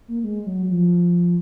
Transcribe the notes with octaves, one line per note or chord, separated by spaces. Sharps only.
A#3
G#3
F#3
F3